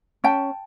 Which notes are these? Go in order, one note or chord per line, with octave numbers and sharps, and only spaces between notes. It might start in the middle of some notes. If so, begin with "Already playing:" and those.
C#4 G5 A5